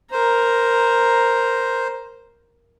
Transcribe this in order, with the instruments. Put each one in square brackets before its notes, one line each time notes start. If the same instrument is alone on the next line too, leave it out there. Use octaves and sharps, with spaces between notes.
[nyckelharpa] A#4 A#5 [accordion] C5